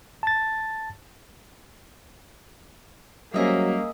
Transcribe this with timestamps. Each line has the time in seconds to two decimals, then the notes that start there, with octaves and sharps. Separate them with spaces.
0.23 A5 A6
3.34 F#3 G3 A#3 C#4 G#4 C5 D#5 E5